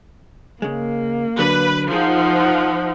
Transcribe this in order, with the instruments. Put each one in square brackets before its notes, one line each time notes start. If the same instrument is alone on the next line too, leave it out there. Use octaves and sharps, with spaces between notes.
[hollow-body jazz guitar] C#3 G#3 [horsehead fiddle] A#3
[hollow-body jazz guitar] D3 F#3 [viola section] B4
[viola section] F3 [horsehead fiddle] D#4 F#5 [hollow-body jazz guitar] F4 G#4 A#4